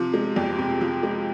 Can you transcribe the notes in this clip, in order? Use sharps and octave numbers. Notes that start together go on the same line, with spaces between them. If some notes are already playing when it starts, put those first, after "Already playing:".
Already playing: C3 F3
G#3
F2
C3
F3
G#3